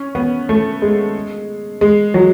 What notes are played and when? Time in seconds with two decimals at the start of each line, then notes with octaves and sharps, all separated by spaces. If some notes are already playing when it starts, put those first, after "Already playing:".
Already playing: C#4
0.15 B3
0.49 A3
0.82 G#3
1.81 G#3
2.14 F#3